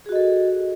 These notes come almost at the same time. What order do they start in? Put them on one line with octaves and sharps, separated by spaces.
G#4 F#4 D#5 A4